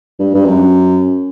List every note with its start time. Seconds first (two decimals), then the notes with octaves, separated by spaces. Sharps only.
0.19 G2
0.34 G2
0.45 F#2